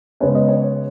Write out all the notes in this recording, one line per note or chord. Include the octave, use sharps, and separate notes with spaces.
C#3 G#3 B3 C#5
D#5
C#5